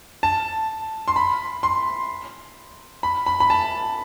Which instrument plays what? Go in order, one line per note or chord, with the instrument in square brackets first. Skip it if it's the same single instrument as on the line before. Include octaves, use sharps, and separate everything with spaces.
[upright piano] A5
C6
B5
C6
B5
B5
B5
A5